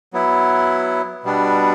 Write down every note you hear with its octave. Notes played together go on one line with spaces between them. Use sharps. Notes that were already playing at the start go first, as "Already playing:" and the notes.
F#3 B3 E4
B2 G3 B3 D4